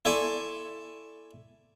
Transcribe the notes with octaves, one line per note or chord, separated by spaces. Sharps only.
E4 A4 D5 G#5 C6 C#6